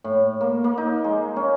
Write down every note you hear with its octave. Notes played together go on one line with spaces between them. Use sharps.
A2
A#3
A#3
D#4
G#3
C#4